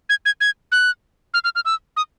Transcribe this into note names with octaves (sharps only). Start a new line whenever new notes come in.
G#6
G#6
G#6
F#6
F6
F6
F6
E6
D#6